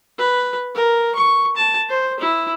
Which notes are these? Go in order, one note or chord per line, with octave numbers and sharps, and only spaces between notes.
B4
A#4
C#6
A5
C5
E4